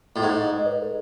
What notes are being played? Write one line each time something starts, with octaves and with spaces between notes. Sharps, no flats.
A2
G#2 D#5
D#5
B4
A4